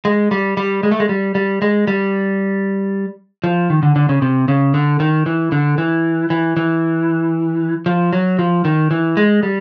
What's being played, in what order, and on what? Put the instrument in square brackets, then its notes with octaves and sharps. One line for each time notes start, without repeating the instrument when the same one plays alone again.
[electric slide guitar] G#3
G3
G3
G#3
A3
G#3
G3
G3
G#3
G3
F3
D#3
D3
D3
C#3
C3
C#3
D3
D#3
E3
D3
E3
E3
E3
F3
F#3
F3
D#3
E3
G#3
G3